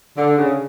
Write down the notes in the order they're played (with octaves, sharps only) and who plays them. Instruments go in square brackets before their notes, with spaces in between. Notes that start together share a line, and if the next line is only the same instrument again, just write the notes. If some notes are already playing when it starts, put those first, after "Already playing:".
[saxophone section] D3
C#3